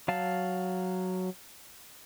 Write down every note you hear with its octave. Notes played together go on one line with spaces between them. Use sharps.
F#3 F5 A5